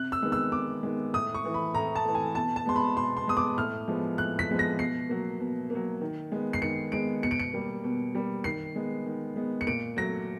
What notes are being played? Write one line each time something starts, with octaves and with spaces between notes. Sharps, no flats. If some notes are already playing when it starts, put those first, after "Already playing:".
Already playing: C3 F#6
E6
D#3 G#3 B3
E6
C3 D6
D#3 G#3 B3
A2 D#6
C#6
E3 A3
B5
A2 A#5
A5
E3 A3
G#5
B2 A5
A5
G#3 B3 C6
B5
B2 C6
C6
G#3 B3 D#6
D6
A2 F6
F3 G#3 B3
A2 F#6
B6
F3 G#3 B3
A#6
B2 C7
F#3 A#3
B2
A#3
F#3
D#3
G#3 B3
C7
D#3 C#7
G#3 B3 D7
B2 C#7
D7
C#7
G3 A#3
B2
G3 A#3
D#3 C7
G#3 B3
D#3
G#3 B3
C#7
A#2 D7
F#3 A3 A#6